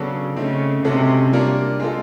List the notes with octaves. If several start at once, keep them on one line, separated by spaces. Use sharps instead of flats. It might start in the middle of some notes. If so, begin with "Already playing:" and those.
Already playing: C#3 F#3 B3 D4 F#4 A4
C#3 A3 C4 D#4
C3 G#3 C#4 F#4 A4
G3 A#3 D4 F4 A#4
G#3 C4 F4 A4